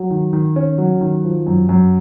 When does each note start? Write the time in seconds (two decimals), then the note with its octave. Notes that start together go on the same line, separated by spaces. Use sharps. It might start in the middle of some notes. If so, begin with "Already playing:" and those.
Already playing: F#3
0.10 D#3
0.33 D#3
0.56 C#4
0.78 F#3
1.01 D#3
1.24 F3
1.47 F#2
1.69 F#2